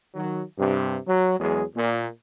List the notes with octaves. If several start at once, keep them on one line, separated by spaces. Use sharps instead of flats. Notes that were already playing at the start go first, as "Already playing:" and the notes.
D#3 F#3
G2 C3
F#3
E2 F#3 G#3 G#4
A#2